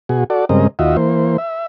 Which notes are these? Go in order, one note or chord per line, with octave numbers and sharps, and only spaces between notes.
B2 F#4 G#4
F#4 A4 D5
G2 C#3 G#3 C4 A#4 D#5
D#2 F4 F#4 D#5 E5
E3 A#3 C5
E5